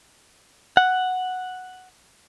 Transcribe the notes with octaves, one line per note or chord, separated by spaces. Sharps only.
F#5